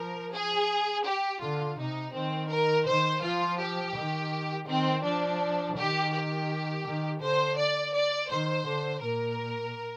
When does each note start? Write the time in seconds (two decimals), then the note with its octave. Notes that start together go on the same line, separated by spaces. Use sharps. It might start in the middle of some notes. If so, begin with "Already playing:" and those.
Already playing: F3 A#4
0.33 G#4
1.06 G4
1.42 D3 F4
1.78 C3 D#4
2.14 D#3 C4
2.50 A#4
2.87 D#3 C5
3.23 F3 F4
3.60 G4
3.96 D#3
4.68 D#3 C4
5.05 F3 D4
5.77 D#3 G4
6.13 G4
6.86 D#3
7.22 D3 C5
7.58 D5
7.94 D5
8.30 D#3 C5
8.67 D3
9.03 A#2 A#4